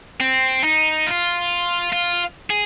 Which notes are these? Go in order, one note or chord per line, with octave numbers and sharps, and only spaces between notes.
C4
D#4
F4
F4
G#4